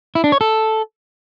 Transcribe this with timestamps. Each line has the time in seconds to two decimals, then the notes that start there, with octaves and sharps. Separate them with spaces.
0.15 E4
0.24 D4
0.32 C#5
0.41 A4